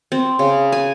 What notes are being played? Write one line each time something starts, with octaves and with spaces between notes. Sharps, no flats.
C4
C#3
G#5